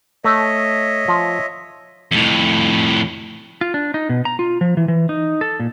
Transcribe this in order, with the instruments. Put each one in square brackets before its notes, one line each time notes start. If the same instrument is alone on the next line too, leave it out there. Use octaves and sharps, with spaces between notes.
[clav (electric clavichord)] A3 [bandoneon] C#5 D#5 E5
[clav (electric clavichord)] F3
[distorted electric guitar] F2 A2
[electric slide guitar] F4
D4
D#4
B2
A#5
F4
F3
E3
E3
D#4
A4
A#2